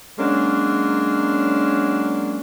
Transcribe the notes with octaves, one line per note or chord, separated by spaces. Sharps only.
F#3 G#3 A#3 C#4 D4